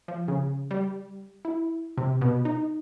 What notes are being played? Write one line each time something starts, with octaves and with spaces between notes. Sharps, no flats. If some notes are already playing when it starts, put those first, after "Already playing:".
F3
C#3
G3
E4
C3
B2
D#4